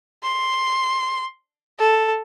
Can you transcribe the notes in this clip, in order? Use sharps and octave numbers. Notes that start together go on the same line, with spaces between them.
C6
A4